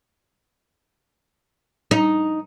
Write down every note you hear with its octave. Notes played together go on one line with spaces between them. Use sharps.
D#4